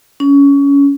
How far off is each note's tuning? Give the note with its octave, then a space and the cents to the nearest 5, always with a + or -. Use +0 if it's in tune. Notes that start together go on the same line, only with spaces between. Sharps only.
C#4 +20